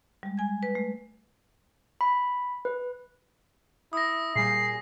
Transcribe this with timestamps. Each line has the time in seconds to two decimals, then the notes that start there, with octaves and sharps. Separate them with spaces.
0.23 G3 G#3
0.38 G#5 G#6
0.63 B4
0.75 A3
2.01 B5
2.65 B4
3.93 E4 D#6 A#6
4.36 A#2 G3 G#4 C7